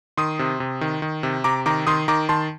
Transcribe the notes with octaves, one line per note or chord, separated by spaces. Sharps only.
D#3 C6 D#6
C3
C3
D#3
D#3
C3
C3 A#5 D6
D#3 A#5 D6
D#3 C6 D#6
D#3 A#5 D6
D#3 A5 C6